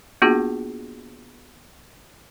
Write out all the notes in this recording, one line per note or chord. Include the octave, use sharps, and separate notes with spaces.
A#3 B3 D4 F4 F#4 G#4